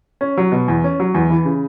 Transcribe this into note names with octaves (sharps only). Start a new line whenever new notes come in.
C#4
F#3
B2
E2
C#4
F#3
E2
E3
C#3